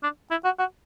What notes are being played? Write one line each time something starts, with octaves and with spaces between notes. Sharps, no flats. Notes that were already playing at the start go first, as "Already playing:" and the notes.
D4
E4
F#4
F#4